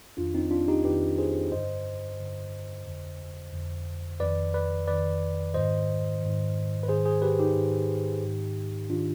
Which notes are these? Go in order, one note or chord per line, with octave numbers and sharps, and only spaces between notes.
F2 D#3 D4 F4
C4 D#4
D4 F4
D#4 G4
F2 D#3 G4 B4
G#4 C5
G2 D3 C5 D#5
G2 D3
F2 D3
F2 D3
F2 D#3 B4 D5
B4 D5
F2 D#3 B4 D5
G#2 D#3 C5 D#5
G#2 D#3
B4
G#2 D#3 G#4 C5
G#4 C5
G4 B4
D#4 G4
G#2 D#3
G#2 D#3
D#3 D4 F4